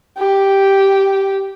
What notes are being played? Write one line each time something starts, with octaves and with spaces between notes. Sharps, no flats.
G4